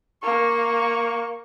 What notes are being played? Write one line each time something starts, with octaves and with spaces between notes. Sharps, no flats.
A#3 C#6